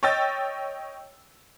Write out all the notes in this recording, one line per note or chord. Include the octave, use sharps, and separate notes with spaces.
C#5 D#5 G5 E6 A6